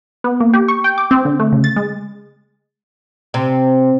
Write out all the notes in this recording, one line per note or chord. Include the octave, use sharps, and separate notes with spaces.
B3
A#3
G4
C#6
G5
D6
C4
D3
A3
C#3
A6
G#3
C3